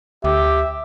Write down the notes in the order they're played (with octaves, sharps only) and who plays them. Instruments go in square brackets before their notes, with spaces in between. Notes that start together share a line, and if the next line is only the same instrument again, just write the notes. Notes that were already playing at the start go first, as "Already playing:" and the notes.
[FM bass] D2 [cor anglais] G4 [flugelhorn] E5